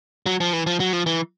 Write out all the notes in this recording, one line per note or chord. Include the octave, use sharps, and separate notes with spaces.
F#3
F3
E3
F3
F#3
F3
E3